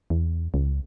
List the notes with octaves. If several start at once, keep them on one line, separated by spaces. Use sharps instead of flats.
E2
C#2